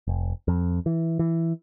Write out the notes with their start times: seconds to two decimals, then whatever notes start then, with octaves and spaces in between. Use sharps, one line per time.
0.07 F1
0.48 F2
0.86 E3
1.19 E3